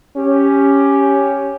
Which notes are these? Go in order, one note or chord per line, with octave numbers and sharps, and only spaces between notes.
C#4 G4